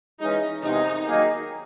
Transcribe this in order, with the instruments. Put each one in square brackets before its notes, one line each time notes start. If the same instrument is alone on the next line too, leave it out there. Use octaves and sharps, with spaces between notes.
[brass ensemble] E3 G#3 C#4 [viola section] D#4
[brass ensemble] E2 C3 D#3 G#3 [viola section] D#4
[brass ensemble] D#3 F#3 A#3 D#4 G#4